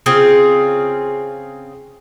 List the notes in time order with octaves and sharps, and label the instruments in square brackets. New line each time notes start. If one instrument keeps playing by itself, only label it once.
[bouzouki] C#3 C4 F4 G#4